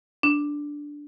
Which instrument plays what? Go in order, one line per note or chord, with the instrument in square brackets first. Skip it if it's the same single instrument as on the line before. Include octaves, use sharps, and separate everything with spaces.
[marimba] D4